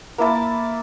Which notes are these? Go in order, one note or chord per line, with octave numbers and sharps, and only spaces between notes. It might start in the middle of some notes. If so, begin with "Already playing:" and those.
A#3 E4 E5 A5